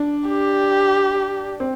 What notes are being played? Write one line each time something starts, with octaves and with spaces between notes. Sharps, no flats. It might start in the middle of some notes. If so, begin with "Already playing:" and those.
Already playing: D4
G4
C4